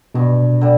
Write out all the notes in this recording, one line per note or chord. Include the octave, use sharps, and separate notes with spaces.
G2 B2
D3 G3